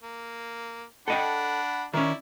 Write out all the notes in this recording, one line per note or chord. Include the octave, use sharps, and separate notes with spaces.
A#3
D4 A4 D#5 F#5 G5 B5
D#3 C#4 E4 D5